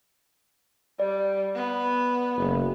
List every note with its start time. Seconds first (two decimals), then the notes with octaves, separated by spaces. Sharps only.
1.00 G3 D5
1.55 B3
2.38 F#1